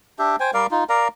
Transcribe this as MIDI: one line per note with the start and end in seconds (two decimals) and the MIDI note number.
0.19 0.36 62
0.19 0.36 67
0.19 0.36 76
0.40 0.51 72
0.40 0.51 79
0.40 0.51 80
0.54 0.67 55
0.54 0.67 70
0.54 0.67 74
0.54 0.67 77
0.71 0.84 63
0.71 0.84 65
0.89 1.08 70
0.89 1.08 74
0.89 1.08 77
0.89 1.08 82